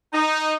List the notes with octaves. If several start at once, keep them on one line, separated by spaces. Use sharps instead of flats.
D#4